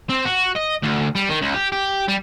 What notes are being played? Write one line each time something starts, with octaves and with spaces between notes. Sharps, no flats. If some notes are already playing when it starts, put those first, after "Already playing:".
C4
F#4
D#5
D2
G3
D#3
C#2
G4
G4
G3